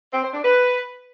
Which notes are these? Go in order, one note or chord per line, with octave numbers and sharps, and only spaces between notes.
C4
C5
D4
B4